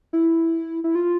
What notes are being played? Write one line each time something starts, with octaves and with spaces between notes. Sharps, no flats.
E4
E4
F4